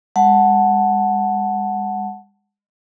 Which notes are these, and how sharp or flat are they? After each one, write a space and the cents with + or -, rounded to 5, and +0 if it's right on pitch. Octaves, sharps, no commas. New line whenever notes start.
G#3 -35 F#5 +0 A5 +0